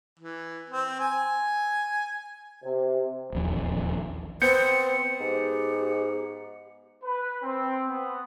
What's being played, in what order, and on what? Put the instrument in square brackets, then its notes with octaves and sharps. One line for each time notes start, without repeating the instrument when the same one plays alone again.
[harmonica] E3
C4
G#5
[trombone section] C3
[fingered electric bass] D#1 A#1 E2
[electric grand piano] B3 G6 [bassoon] C4 [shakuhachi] C5 [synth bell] C#7
[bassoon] G#2 [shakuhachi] G4
[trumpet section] B4
C4
B3